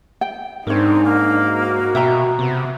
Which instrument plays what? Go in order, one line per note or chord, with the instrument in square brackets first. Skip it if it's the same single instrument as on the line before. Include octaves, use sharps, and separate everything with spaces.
[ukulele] G5
[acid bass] G#2 [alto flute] C4 [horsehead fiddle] D4 D#4 [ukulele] A#4 C#5
[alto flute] A#3
[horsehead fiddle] F#4
[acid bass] B2 [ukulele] E5 G5 A#5
[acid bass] C3 [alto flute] B3